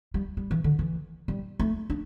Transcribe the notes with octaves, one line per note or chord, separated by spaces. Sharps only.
G3
G3
E3
D3
E3
G3
A3
D4